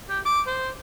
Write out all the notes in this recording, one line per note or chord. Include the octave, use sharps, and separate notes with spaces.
G4
D6
C5